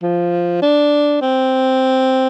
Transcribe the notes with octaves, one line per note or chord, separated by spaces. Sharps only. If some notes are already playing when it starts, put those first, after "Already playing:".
F3
D4
C4